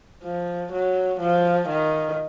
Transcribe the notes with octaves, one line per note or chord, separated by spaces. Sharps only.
F3
F#3
F3
D#3